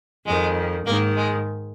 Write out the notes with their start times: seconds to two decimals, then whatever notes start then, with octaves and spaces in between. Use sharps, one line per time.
0.25 F2 D#3 G#3
0.85 G#2 D#3 A#3
1.16 G#3